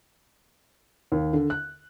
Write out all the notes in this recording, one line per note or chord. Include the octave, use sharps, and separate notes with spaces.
D#2
D3
F#6